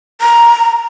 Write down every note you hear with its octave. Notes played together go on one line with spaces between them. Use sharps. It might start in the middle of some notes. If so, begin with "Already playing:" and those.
A#5